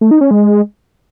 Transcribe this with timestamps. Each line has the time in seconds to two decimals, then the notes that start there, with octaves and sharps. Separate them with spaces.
0.01 A3
0.11 D#4
0.21 C#4
0.31 G#3